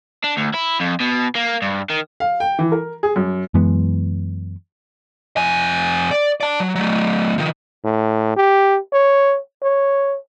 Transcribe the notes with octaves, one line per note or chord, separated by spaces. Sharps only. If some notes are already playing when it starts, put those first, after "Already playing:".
D4
D2
E4
F2
B2
A#3
G2
D#3
F5
G5
E3
A#4
G#4
F#2
F#2 E3 G#3 B3
F2 G#5
D5
D5 A5
F#3
F#3 A3
D#3 F3
A2
G4
C#5
C#5